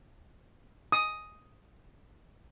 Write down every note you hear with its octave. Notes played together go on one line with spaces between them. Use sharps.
D#6